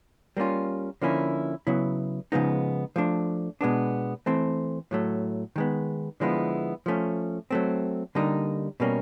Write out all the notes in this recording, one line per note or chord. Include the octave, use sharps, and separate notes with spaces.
G3 A#3 C#4 F4
D3 F3 A#3 C#4 E4
C#3 F#3 B3 E4
C#3 F3 G#3 B3 D#4
F3 A3 D4
B2 G#3 B3 D4
E3 A3 C4
A2 F#3 A3
D#3 G#3 B3
D3 F3 G#3 B3 E4
F3 A3 C#4
F#3 A3 C4
D3 G3 A#3 D#4
B2 G3 A#3 C#4